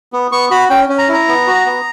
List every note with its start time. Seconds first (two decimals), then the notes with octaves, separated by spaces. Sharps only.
0.13 B3
0.31 B3 C#6
0.51 F#4 B5
0.70 C#4 G5
0.89 C#4
0.98 A#5
1.08 E4
1.14 A#5
1.28 B3
1.47 F#4
1.66 B3